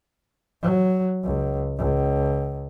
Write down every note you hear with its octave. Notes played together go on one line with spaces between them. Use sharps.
F#3
C#2
C#2